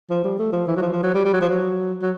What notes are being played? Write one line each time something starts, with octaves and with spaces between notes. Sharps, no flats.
F3
G3
A3
F3
E3
F#3
F3
F3
F#3
G3
G3
F#3
F3
F#3
F#3